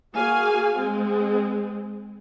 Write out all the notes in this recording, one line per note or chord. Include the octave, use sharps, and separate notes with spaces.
A#3 F#4 G#4 F5 G#5
G#3 C4 G#4